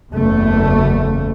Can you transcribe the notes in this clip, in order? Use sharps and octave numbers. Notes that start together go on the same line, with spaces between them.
F#1 E2 A3